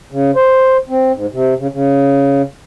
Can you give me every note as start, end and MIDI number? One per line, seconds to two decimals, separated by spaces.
0.12 0.31 49
0.36 0.77 72
0.89 1.12 60
1.15 1.26 44
1.33 1.54 48
1.59 1.67 49
1.72 2.42 49